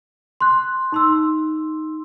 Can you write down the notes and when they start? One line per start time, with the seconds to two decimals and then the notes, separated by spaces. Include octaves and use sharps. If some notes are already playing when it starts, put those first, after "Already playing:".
0.40 C6 F#6
0.92 D#4 C6 E6